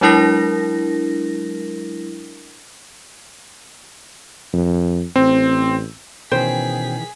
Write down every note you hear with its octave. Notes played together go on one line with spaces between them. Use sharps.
F#3 G#3 D4 E4 A#4 A#6
F2
A1 C4
B2 D#3 E3 C#4 G#4 C5 G5 B6